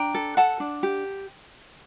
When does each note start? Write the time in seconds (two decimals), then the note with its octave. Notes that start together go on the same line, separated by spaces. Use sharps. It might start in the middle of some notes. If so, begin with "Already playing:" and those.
Already playing: D4 G5 A#5
0.14 A4
0.37 A4 F#5 A5
0.60 D4
0.83 G4